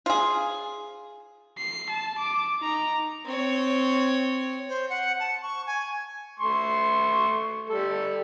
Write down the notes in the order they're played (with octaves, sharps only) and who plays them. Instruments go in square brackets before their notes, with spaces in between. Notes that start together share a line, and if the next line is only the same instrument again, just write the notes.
[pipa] F4 G#4
[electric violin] C7
A5
D6
D#4 A#5
[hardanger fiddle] C4 C#5
[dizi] C5
F#5
A5
C#6
G#5
[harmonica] A3 C6 C#6
G3 A4